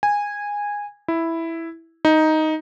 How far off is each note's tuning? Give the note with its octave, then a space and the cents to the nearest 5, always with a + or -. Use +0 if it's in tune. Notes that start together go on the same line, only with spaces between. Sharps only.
G#5 -15
E4 +0
D#4 +5